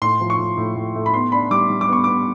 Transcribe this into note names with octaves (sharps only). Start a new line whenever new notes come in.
A2 C6
F3
C#6
A2
A2
A2
A3
B5
B3 C6
D4 B5
G3 D6
G3
D6
B3 C#6
B3 D6